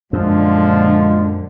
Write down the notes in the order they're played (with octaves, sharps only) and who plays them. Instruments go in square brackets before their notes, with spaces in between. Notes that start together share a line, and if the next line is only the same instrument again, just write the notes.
[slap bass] F#2 [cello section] A#2 D3 [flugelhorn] F3 [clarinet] G#3